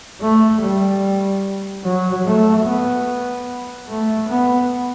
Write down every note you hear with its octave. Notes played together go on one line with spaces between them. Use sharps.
A3
G3
F#3
A3
B3
A3
B3